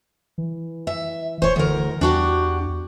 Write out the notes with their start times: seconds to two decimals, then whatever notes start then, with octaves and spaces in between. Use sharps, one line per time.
0.38 E3
0.87 E5
1.42 D#1 C5 C#5
1.56 D2 E3 A#4
2.01 E2 D4 F#4 G4